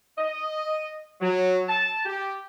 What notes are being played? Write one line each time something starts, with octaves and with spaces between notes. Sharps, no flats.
D#5
F#3
A5
G4